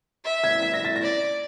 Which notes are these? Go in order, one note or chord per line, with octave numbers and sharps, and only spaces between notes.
E5
G#6
B6
A#6
A6
A#6
D5